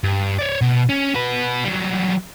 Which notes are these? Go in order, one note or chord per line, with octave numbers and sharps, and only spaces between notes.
G2
C#5 D5
B2
C#4
F#4 B4
F#3 G3